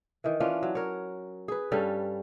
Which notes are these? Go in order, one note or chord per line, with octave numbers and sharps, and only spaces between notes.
D#3 E3
E3 C#4 D4 F4
F#3
A#4 C#5
G#4 B4
G2 G3 C#4 A4